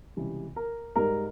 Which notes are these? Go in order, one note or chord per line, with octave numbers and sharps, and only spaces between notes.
C#2 C3 E3 G3
A#4
G#2 G3 A#4